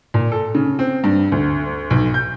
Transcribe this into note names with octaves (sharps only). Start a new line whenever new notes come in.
A#2
A4
C#3
C4
G2
D2
B1
G6